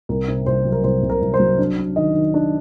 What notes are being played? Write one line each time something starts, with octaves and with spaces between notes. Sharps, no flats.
C2 A#4
C3
C2 C5
F#3
A#4
C2 C5
C2
A#4
C2
C5
F#3
D4
D4
D#3 D#5
D#3
D4